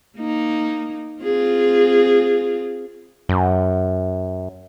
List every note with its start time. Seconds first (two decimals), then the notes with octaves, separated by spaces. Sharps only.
0.17 A#3 D#4
1.23 C4 F4 G#4
3.29 F#2